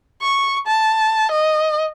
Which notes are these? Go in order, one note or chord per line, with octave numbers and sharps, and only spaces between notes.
C#6
A5
D#5